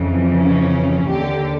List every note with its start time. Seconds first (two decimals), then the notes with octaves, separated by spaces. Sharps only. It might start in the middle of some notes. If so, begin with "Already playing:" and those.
Already playing: F2 C#3 E3
0.37 C#4
1.10 D#2 D3 G4